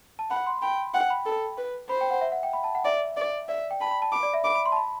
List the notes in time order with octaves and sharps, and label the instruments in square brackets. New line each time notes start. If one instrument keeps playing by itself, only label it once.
[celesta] A5
[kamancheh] F#5 [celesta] B5
[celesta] C6
[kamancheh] G5 [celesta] B5
[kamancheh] F#5 [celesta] G5
[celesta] B5
[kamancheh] A4
B4
[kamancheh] C5 [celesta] B5
[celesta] G5
F#5
E5
F#5
G5
B5
A5
F#5
[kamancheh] D5 [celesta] E5
[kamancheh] D5
[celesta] D5 [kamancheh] E5
[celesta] G5
[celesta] A5 [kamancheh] B5
[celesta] B5
A5
[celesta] B5 [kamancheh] D6
[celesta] D5
E5
[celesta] B5 [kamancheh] D6
[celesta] B5
C6
A5
B5